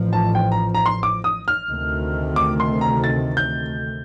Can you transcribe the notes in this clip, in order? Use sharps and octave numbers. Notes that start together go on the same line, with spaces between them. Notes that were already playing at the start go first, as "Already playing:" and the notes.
Already playing: A1 A2 F3
A5
G5
A#5
A#5
C6
D6
D#6
F6
D2 C3 D#3 A3
D6
C6
A#5
A6
G6